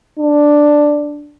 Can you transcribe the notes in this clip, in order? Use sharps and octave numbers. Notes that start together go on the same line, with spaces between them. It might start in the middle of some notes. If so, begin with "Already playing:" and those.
D4